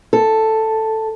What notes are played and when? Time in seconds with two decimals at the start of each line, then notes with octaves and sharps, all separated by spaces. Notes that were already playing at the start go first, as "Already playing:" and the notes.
0.13 A4